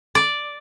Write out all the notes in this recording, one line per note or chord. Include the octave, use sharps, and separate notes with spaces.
D5